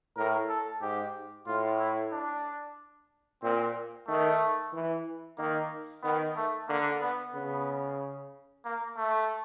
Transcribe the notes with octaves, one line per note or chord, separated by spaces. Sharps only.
A2 A#4
A4
G#2 G4
A2 F4
E4
D4
A#2 C4
D#3 A3
E3
D#3 A#3
D#3 B3
A3
D3 A#3
B3
C#3 B3
A#3
A3